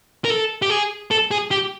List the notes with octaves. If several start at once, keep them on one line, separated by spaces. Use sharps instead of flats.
A#4
A4
G4
G#4
A4
G#4
G4